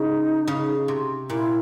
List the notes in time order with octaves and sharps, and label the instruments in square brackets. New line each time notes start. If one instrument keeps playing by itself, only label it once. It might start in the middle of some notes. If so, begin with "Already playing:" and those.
Already playing: [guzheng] C#3 [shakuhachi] D#4
[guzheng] C#3
C3
[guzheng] A#2 [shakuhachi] E4